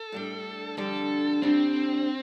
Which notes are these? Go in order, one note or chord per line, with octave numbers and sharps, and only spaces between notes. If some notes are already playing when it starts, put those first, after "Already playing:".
Already playing: A4
A2 G3 D4
F2 D3 G3 D4 A4
F2 D3 G3 C4 D4